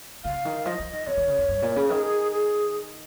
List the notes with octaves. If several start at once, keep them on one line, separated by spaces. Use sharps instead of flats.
C#3 F5
D#3
F3 D#5
F3
D#3
C3 C#5
D#3
C#3
F2
G2
A#2
C#3
D#3 G#4
G#4